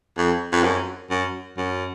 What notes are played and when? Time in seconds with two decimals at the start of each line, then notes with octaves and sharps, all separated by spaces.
0.17 F2
0.52 F2
0.64 F#2
1.10 F#2
1.57 F#2